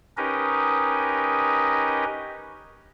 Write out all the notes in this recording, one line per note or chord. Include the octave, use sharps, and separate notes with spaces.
C#4 D#4 G4 A#4 B4 D#5